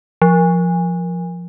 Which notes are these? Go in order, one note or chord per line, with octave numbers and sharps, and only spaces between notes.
F3